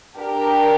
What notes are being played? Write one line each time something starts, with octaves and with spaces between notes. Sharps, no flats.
D4 G4 A#4